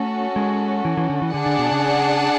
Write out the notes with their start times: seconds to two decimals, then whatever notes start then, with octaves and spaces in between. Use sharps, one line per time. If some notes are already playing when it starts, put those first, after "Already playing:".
Already playing: A3 C#4 F#4 A4
0.36 G#3
0.85 E3
0.97 E3
1.10 D3
1.22 E3
1.34 D3 D4 G#4 D5 F#5 A5
1.46 D3
1.59 B2
1.71 C#3